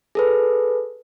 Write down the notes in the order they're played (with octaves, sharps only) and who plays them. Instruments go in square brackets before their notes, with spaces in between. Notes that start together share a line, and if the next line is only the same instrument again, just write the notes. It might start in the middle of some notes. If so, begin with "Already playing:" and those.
[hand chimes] G#4 A4 B4